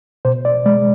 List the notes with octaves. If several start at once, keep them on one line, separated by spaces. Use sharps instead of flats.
B2 C5
D5
G#3 D5